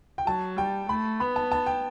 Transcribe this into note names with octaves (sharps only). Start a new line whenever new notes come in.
G5
F#3 A5
G3 G5
A3 B5
B3 B5
A5
A5
G5